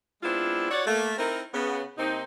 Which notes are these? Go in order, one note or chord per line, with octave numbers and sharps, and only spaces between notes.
G#3 B3 C4 D4 E4 F4
F#4 C#5 D5
A3 A#3
C4 D#4 E4 A#4
C#3 B3
C3 A#3 C4 D#4